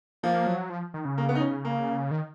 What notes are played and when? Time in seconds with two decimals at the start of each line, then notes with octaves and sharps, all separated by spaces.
0.23 F3 A#3
0.47 F#3
0.70 F3
0.94 D#3
1.05 C#3
1.18 A#3
1.29 B3
1.35 D#4
1.40 C#4
1.65 A#3
2.11 D#3